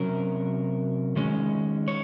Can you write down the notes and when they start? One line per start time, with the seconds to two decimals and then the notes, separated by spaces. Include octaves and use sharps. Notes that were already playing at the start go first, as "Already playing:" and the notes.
Already playing: C3 F#3 C#4 A#4
1.16 D#3 G#3 C#4
1.88 C#5